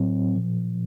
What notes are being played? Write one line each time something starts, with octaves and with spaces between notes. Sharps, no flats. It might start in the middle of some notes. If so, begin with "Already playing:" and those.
Already playing: A2 F#3 C4
A#2 F3